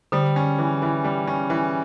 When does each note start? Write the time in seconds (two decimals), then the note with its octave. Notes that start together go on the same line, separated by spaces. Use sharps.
0.12 D3 G3
0.36 C#4
0.59 E3
0.82 E3
1.04 G3
1.27 C#4
1.50 E3